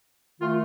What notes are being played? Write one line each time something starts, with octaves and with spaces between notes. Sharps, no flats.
D#3 A3 F4